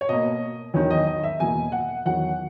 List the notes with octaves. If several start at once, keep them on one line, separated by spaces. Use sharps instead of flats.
C#5
B2 A#3 D#5
E2 D#3 F#3 C#5
D#5
D#5
E5
E2 B2 A#3 G#5
F#5
E2 D#3 F#3 F#5